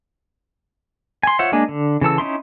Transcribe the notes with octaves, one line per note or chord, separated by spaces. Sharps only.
G#5 C6
F4 C5 C#5 E5 F#5
G#3 A#3 D4 G#5
D3
C#3 E3 A4 E6
C#4 D#4 E4 C6